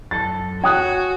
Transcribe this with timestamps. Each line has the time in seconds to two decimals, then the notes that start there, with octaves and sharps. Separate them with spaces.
0.11 F#2 A4 A5 A6
0.64 F#4 C#5 G5 G#5 D#6 F#6